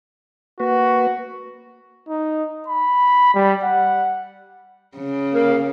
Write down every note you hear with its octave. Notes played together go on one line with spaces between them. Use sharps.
A#3 F#4 B4
D#4
B5
G3
F#5
C#3
A#3 F5